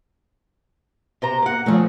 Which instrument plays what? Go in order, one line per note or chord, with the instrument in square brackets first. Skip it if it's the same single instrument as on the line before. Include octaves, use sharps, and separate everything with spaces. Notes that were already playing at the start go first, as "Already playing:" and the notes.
[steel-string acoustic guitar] C3 C5 A#5
A#3 F#5
[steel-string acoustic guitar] D3 C4 G#4 [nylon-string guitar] F3 A3